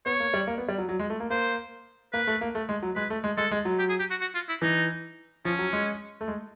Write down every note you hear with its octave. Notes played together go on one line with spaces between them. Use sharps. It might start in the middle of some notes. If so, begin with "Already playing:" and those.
B3 C#5
A#3
G3
A#3
B3
G3
F#3
F#3
G#3
A3
A#3
A#3 C5
A#3 B4
A3
A#3
A3
G#3
F#3
G#3 B4
A3
G#3
G#3 A4
G#3
F#3
G4
G#4
G4
F#4
F#4
F4
E4
E3 D#4
F3 C#4
F#3
G#3
A3
G#3